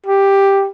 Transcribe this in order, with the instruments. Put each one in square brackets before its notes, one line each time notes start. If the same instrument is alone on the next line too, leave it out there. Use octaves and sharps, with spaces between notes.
[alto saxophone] G4